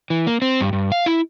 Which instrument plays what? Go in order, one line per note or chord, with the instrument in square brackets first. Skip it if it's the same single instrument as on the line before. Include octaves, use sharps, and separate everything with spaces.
[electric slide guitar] E3
A#3
C4
G2
G2
F5
E4